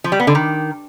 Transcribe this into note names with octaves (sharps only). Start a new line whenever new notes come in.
F3
G3
B3
D3
D#3